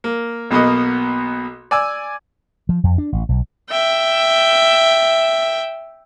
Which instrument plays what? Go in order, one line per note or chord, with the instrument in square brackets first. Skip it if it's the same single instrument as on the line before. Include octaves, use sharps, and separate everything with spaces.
[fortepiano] A#3
B1 B2 A#3 B3 D#5
D5 G#5 E6
[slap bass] F3
F2
D4
A1
B1
[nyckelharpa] E5 G5